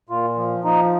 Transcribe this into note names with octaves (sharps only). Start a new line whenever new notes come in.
A#2 F4
F3
F3 D#4